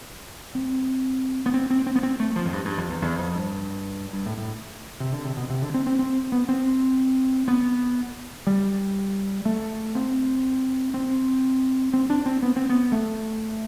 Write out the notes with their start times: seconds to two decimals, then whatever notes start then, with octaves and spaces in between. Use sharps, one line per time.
0.55 C4
1.46 B3
1.54 C4
1.70 C4
1.87 C4
1.96 B3
2.03 C4
2.20 A3
2.36 F3
2.46 F2
2.52 G2
2.65 G2
2.78 F2
2.90 E2
3.02 E2
3.19 F2
3.35 G2
4.13 G2
4.26 A2
4.38 A2
5.00 C3
5.13 D3
5.25 C3
5.37 B2
5.50 C3
5.62 D3
5.74 C4
5.87 C4
5.99 C4
6.32 B3
6.49 C4
7.48 B3
8.47 G3
9.45 A3
9.95 C4
10.94 C4
11.93 C4
12.10 D4
12.26 C4
12.42 B3
12.56 C4
12.69 B3
12.92 A3